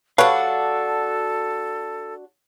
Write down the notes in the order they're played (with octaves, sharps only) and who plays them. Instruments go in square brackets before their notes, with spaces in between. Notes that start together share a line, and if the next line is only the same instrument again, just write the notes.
[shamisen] G3 B4 C#5 [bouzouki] D4 F#4 [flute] A4 [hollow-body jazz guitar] F5